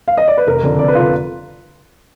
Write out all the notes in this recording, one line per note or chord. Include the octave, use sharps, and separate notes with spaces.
F5
D#5
D5
B4
F1 A#4
F2 D3
F1 D5
B4
F4
D3